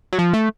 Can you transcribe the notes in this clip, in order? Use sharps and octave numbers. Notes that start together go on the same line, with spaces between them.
F#3
F3
A3